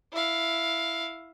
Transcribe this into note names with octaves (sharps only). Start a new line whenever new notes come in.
E4 F5